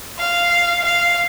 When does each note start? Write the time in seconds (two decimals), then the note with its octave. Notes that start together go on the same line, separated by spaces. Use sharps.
0.19 F5
0.84 F5